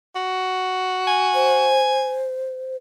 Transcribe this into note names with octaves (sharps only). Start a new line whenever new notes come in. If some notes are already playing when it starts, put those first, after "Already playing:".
F#4
G#5
C5